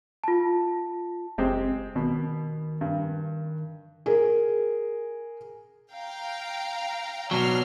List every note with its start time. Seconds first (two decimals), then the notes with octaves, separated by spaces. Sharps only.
0.24 F4 A5
1.38 F#1 G#3 C4 G4
1.96 B2 D#3
2.81 G2
4.06 G#4 A#4
5.94 F5 G5 A#5
7.31 B2 F#3 D5 F6 C7